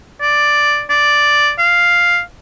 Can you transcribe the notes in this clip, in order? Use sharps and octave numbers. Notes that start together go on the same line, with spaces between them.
D5
D5
F5